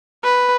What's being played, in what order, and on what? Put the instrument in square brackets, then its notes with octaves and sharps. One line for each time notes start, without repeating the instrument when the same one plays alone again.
[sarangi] B4